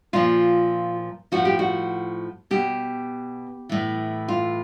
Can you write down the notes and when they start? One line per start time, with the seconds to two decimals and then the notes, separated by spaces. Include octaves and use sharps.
0.13 A#2 F3 F4
1.32 A2 F3 F#4
1.45 G4
1.59 F#4
2.51 B2 G4
3.69 A2 E3
4.28 F4